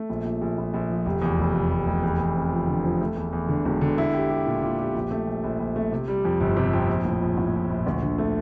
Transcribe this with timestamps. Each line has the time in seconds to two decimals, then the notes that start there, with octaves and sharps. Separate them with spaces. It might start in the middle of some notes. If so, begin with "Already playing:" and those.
Already playing: A3
0.09 A#1
0.25 A#1
0.41 A#1
0.58 A#1
0.74 A#1
0.90 F3
1.06 F1
1.22 E2
1.38 F1
1.55 F1
1.71 F1
1.87 F1
2.03 E2
2.20 E2
2.35 C4
2.52 F3
2.68 D3
2.84 F3
3.01 A3
3.16 E2
3.33 E2
3.48 D3
3.65 E1
3.81 D3
3.98 E4
4.14 G4
4.30 G4
4.46 A#2
4.62 A#2
4.79 G4
4.95 A#1
5.11 A3
5.27 A#1
5.44 A#1
5.60 A#1
5.76 A3
5.92 C3
6.08 G3
6.25 F2
6.41 G1
6.57 C3
6.73 F2
6.89 A#1
7.05 A2
7.22 A#1
7.38 A2
7.54 A#1
7.70 A#1
7.87 D2
8.02 D3
8.18 A3